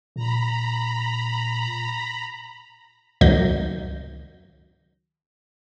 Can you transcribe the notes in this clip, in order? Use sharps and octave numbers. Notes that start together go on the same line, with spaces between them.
A#2 A#5 B5
C#2 D#3 F#3 G6 A#6